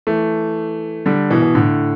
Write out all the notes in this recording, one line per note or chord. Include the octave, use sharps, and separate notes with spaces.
E3 A3
D3 G3
B2 E3
B2
A2 D3